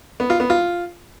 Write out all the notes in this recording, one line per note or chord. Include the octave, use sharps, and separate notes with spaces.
B3
F4
B3
F4